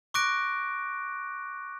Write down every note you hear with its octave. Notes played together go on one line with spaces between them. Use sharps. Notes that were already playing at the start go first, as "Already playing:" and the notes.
C#6 D6 F#6 A#6 D7